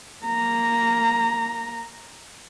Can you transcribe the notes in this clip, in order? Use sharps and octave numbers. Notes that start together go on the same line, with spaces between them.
A#3 A#5